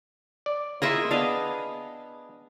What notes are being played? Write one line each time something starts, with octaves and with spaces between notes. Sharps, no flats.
D5
A#3 E4 F4 G#4 D#5 E5
B3 D4 D#5 F5